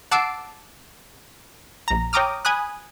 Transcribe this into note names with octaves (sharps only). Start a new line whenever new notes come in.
F#5 A5 D6 E6 C7 D7
A#1 A#5
C#5 G5 A#5 D6 D#6 F6
G#5 B5 D#6 F#6